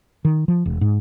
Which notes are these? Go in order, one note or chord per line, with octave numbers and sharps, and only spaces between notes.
D#3
F3
E1
G#2